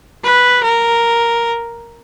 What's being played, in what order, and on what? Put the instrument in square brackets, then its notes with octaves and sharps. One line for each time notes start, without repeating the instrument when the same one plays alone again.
[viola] B4
A#4